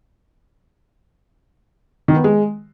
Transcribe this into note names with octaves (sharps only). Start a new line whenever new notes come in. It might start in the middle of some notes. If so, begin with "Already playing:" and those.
D#3
B3
G#3